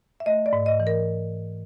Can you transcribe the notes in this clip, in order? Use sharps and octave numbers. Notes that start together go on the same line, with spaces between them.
E5
A3 D#5
D5
G#2
D#5
E3
A#4